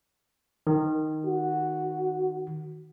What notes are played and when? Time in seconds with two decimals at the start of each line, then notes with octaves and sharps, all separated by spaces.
0.67 D#3
1.25 F#4